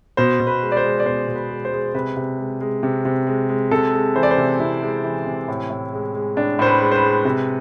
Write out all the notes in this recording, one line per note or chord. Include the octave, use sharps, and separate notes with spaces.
B2 C5
B2
B4
G#3
D5
C5
G#3
D5
B2 C5
B2
B4
G#3
C5
G#3
C3 B4
C3
G#3
G#3
C3
C3
G#3
G#3
C3 A4
G#3
E3 C5
D5
C5
C3
C3 E4
G#3
E3
C3
A2
A2
G#3
G#3
A2 D4
A2 C5
B4
G#3
C5
B4
G#3
C3